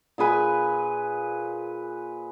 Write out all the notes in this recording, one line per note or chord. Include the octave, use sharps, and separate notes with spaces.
A#2 G#4 B4 G#5